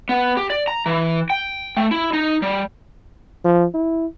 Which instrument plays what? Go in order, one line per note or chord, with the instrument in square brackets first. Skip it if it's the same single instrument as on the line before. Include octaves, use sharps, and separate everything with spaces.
[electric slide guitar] B3
G4
D5
A#5
E3
G5
A3
E4
D#4
G3
[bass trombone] F3
E4